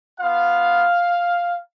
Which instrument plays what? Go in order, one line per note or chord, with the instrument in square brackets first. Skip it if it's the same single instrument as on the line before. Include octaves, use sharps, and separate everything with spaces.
[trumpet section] B3 F4 F5